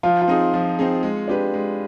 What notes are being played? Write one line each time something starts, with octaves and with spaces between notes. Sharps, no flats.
F3 F4
F4
C4 D#4 G#4
F3
C4 D#4 G#4
G#3
D4 G4 B4
G#3